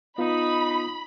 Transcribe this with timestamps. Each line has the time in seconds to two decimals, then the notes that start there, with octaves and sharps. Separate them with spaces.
0.18 B3 D#4 F4 B5